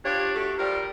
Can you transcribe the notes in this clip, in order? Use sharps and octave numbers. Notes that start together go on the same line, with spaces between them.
F3 D4 F4 G4 C#5
A3 F#4 A4
F3 G3 A#4